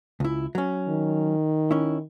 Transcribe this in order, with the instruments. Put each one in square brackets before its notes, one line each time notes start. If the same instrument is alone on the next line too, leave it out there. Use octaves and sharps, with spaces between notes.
[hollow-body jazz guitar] C#2 E4
F#3 C#4
[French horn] D#3
[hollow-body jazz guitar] C#4 E4